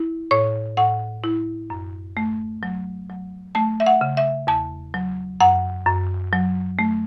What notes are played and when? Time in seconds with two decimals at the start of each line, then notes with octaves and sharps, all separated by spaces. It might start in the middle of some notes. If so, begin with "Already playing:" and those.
Already playing: E4
0.31 A2 C#5
0.77 A2 F#5
1.24 E4
1.70 F#2
2.17 A3
2.63 F#3
3.10 F#3
3.55 A3 A5
3.80 E5
3.86 F#5
4.01 C#3
4.17 E5
4.47 E2 A5
4.94 F#3
5.40 F#2 F#5
5.86 F#2
6.33 F#3
6.79 A3